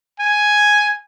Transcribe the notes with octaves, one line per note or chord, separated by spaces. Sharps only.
G#5